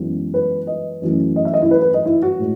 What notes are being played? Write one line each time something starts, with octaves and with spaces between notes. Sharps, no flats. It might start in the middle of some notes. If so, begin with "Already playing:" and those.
Already playing: F#2 E3 G#3 B3
B4
D#5
F#2 E3 A3
D#5
E5
D#5
E4
B4
B4
D#5
E4
F#4
A2 G#3